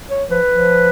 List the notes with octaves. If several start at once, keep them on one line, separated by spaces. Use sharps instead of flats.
C#5
F3 B4
F3